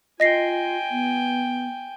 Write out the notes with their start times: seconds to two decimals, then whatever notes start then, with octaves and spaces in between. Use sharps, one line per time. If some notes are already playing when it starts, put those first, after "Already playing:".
0.20 F4 D#5 G5 G#5 A#6 C7
0.91 B3